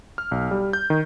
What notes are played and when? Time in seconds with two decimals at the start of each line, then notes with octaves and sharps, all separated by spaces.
0.18 F6
0.31 B1
0.51 G3
0.73 G6
0.90 D#3